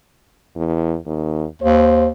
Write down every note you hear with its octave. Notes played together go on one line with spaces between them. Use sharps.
E2
D#2
D#2 C5